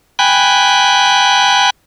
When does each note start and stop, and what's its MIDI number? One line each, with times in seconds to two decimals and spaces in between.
0.19 1.70 79
0.19 1.70 80
0.19 1.70 83
0.19 1.70 90